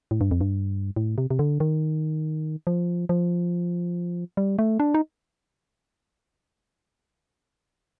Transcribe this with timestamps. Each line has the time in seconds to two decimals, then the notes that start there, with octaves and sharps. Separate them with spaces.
0.11 A2
0.21 G2
0.31 F2
0.41 G2
0.96 A2
1.18 C3
1.31 C3
1.39 D3
1.60 D#3
2.67 F3
3.09 F3
4.37 G3
4.59 A3
4.80 D4
4.94 D#4